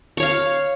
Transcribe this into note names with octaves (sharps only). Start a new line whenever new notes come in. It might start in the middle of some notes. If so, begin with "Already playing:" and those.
C#5 F5 C#6